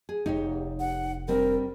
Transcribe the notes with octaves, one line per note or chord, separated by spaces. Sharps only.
G#4
F1 D#4 G4 C#5
F#5
G3 C4 D4 A#4